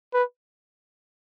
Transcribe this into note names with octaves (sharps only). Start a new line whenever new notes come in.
B4